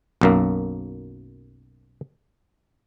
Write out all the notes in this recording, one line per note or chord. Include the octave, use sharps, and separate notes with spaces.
B1 F#2 A#3